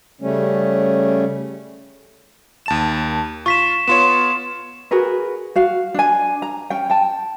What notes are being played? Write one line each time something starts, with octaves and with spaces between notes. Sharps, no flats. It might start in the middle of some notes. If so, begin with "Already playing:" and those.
C#3 G3 A3 C#4
D#2 A5 E7
F4 C#6 B6 E7
B3 F4 C#5 C6 E7
F#4 G#4 A#4 B4
F#4 F5
D4 G#5
A#5
C#4 G5
G5 A5